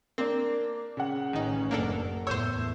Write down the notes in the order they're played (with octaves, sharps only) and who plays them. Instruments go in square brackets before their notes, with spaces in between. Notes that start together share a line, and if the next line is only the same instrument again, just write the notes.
[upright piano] A#3 D4 [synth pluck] C4
[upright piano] C#3 F#5
[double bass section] A1 C#4 [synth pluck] D#3 D#4
[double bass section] F#1 [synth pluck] A#3 D4 A4
[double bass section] E2 A2 [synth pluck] C5 C#5 [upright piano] E6 G6 E7